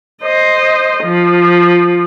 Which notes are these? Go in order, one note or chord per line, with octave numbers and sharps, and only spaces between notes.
C5 D#5
F3